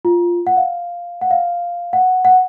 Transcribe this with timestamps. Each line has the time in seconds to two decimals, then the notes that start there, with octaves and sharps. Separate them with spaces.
0.05 F4
0.47 F#5
0.57 F5
1.21 F#5
1.31 F5
1.93 F#5
2.25 F#5